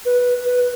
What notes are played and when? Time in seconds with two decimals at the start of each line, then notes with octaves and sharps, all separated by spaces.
0.06 B4
0.46 B4